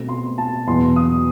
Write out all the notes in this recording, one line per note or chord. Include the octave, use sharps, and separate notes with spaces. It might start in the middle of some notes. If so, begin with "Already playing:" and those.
Already playing: B2 A3 C4
C6
A5
E2 B2 F#3 B3 C6
D#6